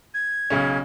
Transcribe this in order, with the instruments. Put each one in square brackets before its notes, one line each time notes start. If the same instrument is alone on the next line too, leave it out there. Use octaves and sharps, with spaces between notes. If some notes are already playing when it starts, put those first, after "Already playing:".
[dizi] G#6
[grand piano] B1 C#3 C#4